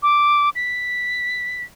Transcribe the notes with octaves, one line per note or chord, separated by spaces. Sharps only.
D6
B6